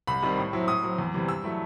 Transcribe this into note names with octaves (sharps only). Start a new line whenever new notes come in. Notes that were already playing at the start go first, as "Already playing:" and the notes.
C2 B5
C3 D#3 G3
A2
F#3 C4 E4
A2 D#6
F#3 C4
E2
C3 E3 G3 C4
G2 E6
F#3 A3 E4